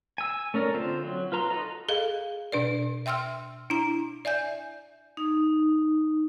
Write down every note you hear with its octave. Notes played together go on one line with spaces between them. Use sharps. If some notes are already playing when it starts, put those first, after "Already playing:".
G#5 E6
A3 C#4 A#4 D5
D3 C4 F4 C5 E5
F#3
F4 B4 A#5 C6
D#4 F#4 A4 D#5 A#5
G#4 A4 D#5 F5
B2 D4 B4 D5
E5 G5 C6 E6 F6
D4 E4 A#5
D5 E5 G#5 G6
D#4